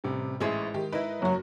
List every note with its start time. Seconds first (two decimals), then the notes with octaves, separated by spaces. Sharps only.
0.04 A1 C3 G3
0.40 A1 G#2 G#3 E4 G#4 C5
0.74 D#3 G4
0.92 D#4 E4 A#4 B4
1.22 F#1 F#3 F#4